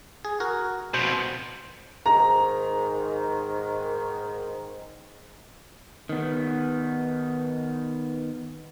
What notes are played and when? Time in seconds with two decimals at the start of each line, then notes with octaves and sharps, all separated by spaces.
0.25 G#4
0.40 F#4 A#4
0.94 F2 B2 C5
2.06 G#2 D#3 A#5
6.09 D#3 B3